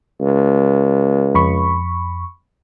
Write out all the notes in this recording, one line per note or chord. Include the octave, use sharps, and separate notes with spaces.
C#2
F2 B5 C#6